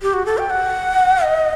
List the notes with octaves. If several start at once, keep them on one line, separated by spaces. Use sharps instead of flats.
G4
F#4
A4
G5
F#5
D#5